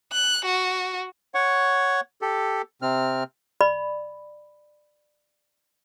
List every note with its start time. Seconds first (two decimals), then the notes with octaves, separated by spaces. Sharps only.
0.13 F#6
0.45 F#4
1.34 C#5 F#5 C#6
2.21 G4 A4
2.82 C3 C4 F6
3.61 D5 B5